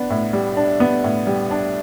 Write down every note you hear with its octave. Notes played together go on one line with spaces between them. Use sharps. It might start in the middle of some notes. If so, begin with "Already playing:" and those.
Already playing: B3 D4
A2
G3
D4
B3
A2
G3
D4